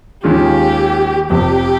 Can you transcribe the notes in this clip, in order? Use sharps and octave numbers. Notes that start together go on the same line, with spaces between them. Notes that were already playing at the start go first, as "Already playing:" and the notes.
D#2 D#3 G#3 C#4 F4 G4
F1 F2 C3 G4